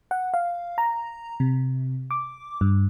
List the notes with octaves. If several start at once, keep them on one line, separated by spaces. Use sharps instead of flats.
F#5
F5
A#5
C3
D6
G2